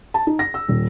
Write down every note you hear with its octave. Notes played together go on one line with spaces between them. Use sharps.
A5
D#4
A#6
E6
D#1